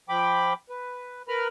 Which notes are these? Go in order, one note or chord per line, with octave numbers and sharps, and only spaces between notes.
F3 G5 B5 D6
B4
A#4 B4 B5 F6